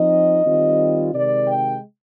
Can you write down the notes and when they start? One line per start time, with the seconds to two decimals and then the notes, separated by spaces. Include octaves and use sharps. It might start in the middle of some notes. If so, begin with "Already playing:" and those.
Already playing: F3 C4 D#4 D#5
0.44 D#3 G3 C4 F4
1.13 C3 D#3 G#3 D5
1.47 G5